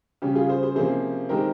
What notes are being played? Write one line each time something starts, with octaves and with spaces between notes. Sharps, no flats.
C#3 G3 C#4 G4
F4 G#4
G#4 C5
G#4 C5
C3 F3 A#3 C#4 G#4 C5
D#3 G#3 C4 G4 A#4